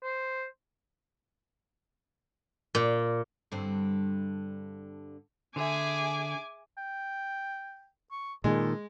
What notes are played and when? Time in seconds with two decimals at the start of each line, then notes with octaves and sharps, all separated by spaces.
0.03 C5
2.75 A#2
3.52 G2 D3 C4
5.56 D3 G#4 E5 G#5 D6
6.78 G5
8.11 C#6
8.44 A#2 D#3 G#3 A4